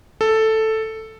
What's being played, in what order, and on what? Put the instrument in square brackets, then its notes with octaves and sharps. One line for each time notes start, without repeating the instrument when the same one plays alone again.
[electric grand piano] A4